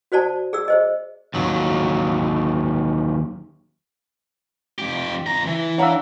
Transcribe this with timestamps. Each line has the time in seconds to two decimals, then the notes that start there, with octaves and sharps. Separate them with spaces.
0.12 F#4 C5 D5 A5
0.53 G#4 D5 E6
0.68 G#4 C5 D#5
1.34 D#2 F#3
4.78 F2 G4
5.26 F2 A#5
5.46 E3
5.78 D4 C#5 F5 F#5 A#5 E6